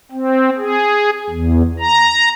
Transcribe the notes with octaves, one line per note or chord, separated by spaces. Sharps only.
C4
G#4
E2
A#5